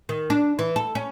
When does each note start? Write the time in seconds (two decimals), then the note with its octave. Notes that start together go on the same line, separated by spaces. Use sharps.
0.09 D#3
0.30 D4
0.59 E3
0.76 A4
0.95 C#4